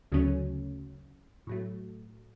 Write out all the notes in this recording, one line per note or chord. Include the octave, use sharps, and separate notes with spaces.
D2 C#3 F#3 A3 C#4
A2 F#3 A3